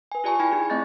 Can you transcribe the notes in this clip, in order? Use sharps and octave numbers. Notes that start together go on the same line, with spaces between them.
B4 G#5
F4 G4 D5 G#5 A5 C#6
E4 G5 A5 B5 G#6
D#4 G#4
A3 C4 D#5 C#6 G6 A6